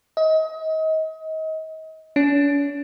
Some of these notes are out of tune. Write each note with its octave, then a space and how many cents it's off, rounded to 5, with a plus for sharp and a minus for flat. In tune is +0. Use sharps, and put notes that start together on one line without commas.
D#5 +30
C#4 +45